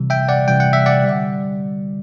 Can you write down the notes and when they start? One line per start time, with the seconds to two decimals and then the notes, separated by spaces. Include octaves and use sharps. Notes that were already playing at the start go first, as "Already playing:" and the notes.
Already playing: C3 E3 G3
0.10 E5 G5
0.29 D5 F#5
0.48 C3 E3 G3 G5
0.60 F#5
0.73 E5
0.86 D5 F#5
1.04 D3 G3